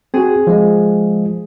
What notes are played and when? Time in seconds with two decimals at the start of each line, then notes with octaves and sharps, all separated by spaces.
0.14 C4 F#4 G#4
0.47 F3 G#3